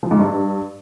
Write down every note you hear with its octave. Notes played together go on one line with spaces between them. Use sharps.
F3
G#2
G2